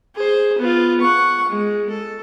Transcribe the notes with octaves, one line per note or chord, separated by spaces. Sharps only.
G#4 C5
B3 F4
F#5 C#6
G#3
A4